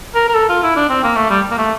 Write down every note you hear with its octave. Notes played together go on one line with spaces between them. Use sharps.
A#4
A#4
A4
F4
E4
D4
C4
A#3
A3
G3
A#3
A3